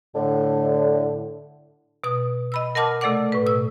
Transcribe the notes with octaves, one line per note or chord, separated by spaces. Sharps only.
A2 D3
B2 D#6
D#5 B5 E6
A#4 D#5 F#5 A5 D6 F6
C3 A3 A4 D5 F#5 D6
A2 B4
B2 E6